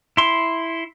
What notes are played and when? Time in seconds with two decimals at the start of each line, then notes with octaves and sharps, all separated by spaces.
0.17 E4 C6